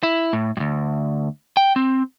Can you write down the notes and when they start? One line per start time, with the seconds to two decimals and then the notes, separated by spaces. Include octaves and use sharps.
0.03 E4
0.33 A2
0.57 D2 G2
1.57 G5
1.76 C4